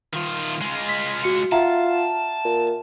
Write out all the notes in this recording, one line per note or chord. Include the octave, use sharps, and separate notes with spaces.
D#3 F4
G#3 F4
B6
F#4 C#7
F4 E5 F#5 A5 A#5
A#2